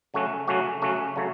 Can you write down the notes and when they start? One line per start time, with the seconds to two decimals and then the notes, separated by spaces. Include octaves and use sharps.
0.14 C#3 F#3 A3 C#4 F#4
0.47 C#3 F#3 A3 C#4 F#4
0.82 C#3 F#3 A3 C#4 F#4
1.16 C#3 F#3 A3